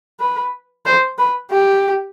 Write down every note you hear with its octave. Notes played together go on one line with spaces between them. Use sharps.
B4
C5
B4
G4